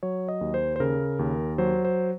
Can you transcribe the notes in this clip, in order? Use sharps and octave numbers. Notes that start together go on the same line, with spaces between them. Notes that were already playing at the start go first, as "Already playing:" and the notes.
F#3 C#5
D#5
D#2
C5
C5
C#3 A#4
D#2
F#3 C5
C5